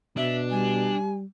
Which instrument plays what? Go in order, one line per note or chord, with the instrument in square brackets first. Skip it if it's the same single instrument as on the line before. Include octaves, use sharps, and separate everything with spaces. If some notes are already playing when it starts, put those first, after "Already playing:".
[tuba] B2 [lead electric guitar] D4 [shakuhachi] E5
[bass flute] G3 [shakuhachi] G#5